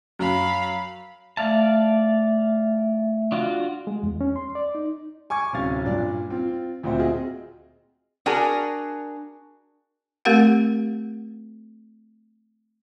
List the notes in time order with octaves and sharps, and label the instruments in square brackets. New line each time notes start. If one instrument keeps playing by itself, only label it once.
[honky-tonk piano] F#2 [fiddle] F5 B5
[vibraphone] A3 E5 [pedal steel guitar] D5 F5 A5
[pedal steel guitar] D4 F4 F#4
[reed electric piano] G#3
E2
C#4
C6
D5
D#4
[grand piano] G#5 C#6 D6 G#6
D1 C3 C#4 F5 A6
G2 A#2 D4 D5
C4 F4
D2 A#2 C4 F#4 C5 E5
C4 F4 G#4 D#5
[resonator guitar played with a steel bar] D4 F#4 G#4 A#4 G#5
[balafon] A3 C4 G4 A#4 F5 F#5